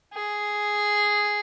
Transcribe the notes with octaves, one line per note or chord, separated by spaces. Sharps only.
G#4